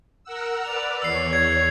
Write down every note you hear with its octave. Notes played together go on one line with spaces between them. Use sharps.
A#4 F#5 E6
B4 D5 F7
E2 C#5 E6 C7
G#6